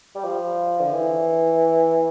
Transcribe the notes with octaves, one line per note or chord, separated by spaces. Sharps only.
G3
F3
D3
E3